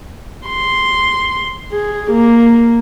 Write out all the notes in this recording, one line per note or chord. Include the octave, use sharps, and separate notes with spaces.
C6
G#4
A#3